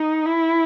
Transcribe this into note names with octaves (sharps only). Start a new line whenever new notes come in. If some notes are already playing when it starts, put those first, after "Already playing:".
Already playing: D#4
E4